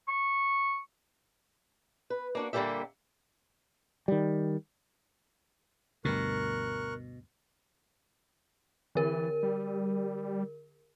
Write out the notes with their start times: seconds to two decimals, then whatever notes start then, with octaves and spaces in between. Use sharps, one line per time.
0.08 C#6
2.10 B4
2.35 A#3 D4 F#4
2.53 A#2 D3 G3 A#3 G4 E5
4.08 D#3 G3
6.05 D2 G2 B2 A#4 C#6 F#6
8.95 D3 E3 A#4
9.43 G3